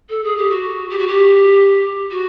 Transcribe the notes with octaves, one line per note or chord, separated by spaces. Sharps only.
A4
G#4
G4
F#4
G4
F#4
G4
F#4